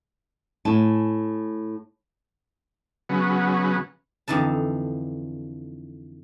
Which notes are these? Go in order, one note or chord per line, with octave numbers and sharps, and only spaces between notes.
A2 G#5 A5
C#3 F#3 B3
F2 D3 E3 D#4 A5